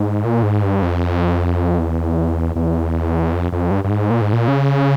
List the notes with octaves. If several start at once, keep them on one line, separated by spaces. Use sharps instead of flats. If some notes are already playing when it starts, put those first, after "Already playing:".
Already playing: G#2
A#2
G#2
G2
F2
E2
E2
F2
F2
G2
G2
G#2
A#2
G#2
A#2
C#3